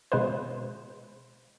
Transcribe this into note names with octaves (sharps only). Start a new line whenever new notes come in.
B2 G#3 B4 C5